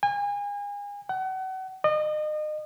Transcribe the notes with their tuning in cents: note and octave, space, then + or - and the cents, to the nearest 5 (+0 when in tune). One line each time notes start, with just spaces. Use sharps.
G#5 -35
F#5 +35
D#5 -35